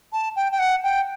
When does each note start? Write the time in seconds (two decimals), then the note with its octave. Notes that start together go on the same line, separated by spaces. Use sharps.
0.13 A5
0.36 G5
0.52 G5
0.59 F#5
0.84 G5